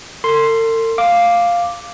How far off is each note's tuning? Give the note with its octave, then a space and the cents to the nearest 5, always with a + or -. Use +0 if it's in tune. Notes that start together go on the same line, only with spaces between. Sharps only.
A4 +45 C6 +0
F5 +0 D6 +0